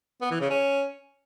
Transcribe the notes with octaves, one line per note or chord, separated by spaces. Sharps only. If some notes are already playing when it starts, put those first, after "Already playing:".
B3
E3
C#3
C#4